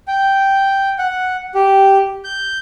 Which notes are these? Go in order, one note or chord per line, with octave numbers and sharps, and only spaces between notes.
G5
F#5
G4
G6